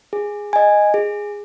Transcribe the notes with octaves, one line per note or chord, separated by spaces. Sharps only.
G#4
D#5 G#5
G#4